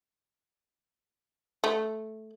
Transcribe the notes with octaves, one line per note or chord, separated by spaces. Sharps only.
A3